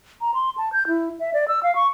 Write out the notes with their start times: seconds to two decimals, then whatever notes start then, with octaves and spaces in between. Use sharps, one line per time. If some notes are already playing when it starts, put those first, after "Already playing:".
0.21 A#5
0.34 C6
0.58 A5
0.73 G6
0.88 E4
1.20 E5
1.34 D5
1.48 E6
1.63 F5
1.75 C#6